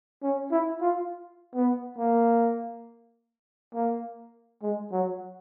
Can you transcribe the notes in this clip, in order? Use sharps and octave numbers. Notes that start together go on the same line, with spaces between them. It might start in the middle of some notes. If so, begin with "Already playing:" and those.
C#4
E4
F4
B3
A#3
A#3
G#3
F#3